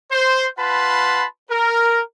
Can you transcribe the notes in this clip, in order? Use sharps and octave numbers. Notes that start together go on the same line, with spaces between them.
C5
F4 B4 F#5 A5 B5 C6
A#4